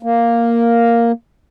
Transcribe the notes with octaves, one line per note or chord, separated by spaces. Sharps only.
A#3